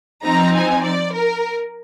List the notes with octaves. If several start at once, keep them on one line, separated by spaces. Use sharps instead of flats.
F3 C4 D#4 A#5
G#5
D5
A#4